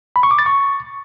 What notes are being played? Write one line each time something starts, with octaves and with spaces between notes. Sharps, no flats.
B5
C#6
D6
A6
C#6